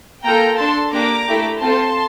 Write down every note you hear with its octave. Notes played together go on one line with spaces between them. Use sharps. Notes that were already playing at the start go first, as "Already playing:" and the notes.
A#3 F4 A4 G5 A#5
D4 A4 A5 C6
A#3 D4 G4 A#5 D6
A3 E4 G4
C4 F4 A4 A5 C6